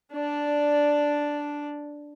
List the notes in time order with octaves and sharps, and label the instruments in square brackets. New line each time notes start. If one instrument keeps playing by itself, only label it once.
[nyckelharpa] D4 D5